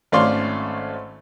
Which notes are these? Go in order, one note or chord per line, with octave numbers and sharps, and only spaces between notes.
G#1 A3 C#4 D5 F5 C6